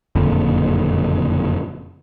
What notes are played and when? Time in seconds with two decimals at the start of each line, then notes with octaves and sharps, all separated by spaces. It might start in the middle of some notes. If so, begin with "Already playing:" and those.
0.15 F#1 F2 A#2 D3